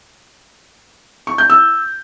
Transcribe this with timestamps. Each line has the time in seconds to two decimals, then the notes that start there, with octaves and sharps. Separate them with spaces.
1.27 C#6
1.38 G6
1.50 E6